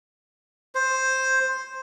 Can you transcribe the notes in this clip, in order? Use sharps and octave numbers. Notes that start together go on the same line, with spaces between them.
C5